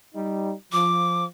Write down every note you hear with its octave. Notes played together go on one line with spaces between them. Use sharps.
G3 D#4
F3 D6